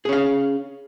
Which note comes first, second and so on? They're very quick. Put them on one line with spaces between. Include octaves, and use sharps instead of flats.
G#4 C#4 F5